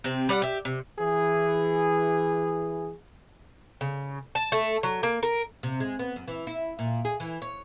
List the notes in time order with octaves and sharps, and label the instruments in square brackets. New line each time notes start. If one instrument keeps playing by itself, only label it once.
[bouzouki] C3 C4
G3 D5 F5 F#5
G4 E5
C3
[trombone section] E3 G#4
[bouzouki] C#3
A5
A3
F#3
A#3
A#4
[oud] C3
G#3
B3
F#2
E3
E4
A#2
G#4
E3
C#5